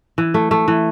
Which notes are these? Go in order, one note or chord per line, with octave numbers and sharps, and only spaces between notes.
E3
A3
A3
E3